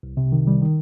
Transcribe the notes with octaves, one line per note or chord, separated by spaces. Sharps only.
C2
C3
D#3
G3
D#3